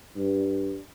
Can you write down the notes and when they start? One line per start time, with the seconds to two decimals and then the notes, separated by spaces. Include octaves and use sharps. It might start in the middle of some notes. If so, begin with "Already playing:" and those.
0.16 G2